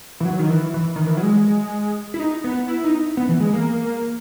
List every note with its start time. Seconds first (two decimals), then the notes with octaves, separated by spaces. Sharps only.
0.20 E3
0.25 F#3
0.39 D#3
0.50 E3
0.74 E3
0.96 D#3
1.06 E3
1.17 F#3
1.23 G#3
2.14 E4
2.20 D#4
2.44 B3
2.68 E4
2.84 D#4
3.17 B3
3.29 E3
3.40 G#3
3.53 A#3